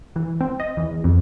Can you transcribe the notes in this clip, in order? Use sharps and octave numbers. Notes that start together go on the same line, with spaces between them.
E3
C4
D#5
E2
F2